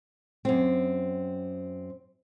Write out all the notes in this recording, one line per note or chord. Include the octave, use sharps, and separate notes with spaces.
F#2 C4